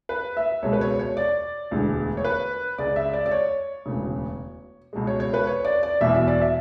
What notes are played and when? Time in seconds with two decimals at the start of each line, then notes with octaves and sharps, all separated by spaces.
0.09 B4
0.37 E5
0.62 C#2 B2 G#3 C#5
0.73 B4
0.81 C#5
0.99 C#5
1.17 D5
1.71 E1 D2 D3 G#3
2.17 C#5
2.25 B4
2.78 C#2 C#3 G#3 D5
2.96 E5
3.14 D5
3.26 D5
3.31 C#5
3.86 E1 D2 C#3
4.93 C#2 B2 G#3
5.07 C#5
5.20 C#5
5.34 B4
5.47 C#5
5.65 D5
5.83 D5
6.01 E1 E2 B2 E5
6.15 E5
6.28 D5
6.41 E5